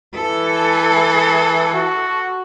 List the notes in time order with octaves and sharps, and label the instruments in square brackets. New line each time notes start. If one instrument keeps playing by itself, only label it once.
[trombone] E3 [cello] A4
[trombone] F#4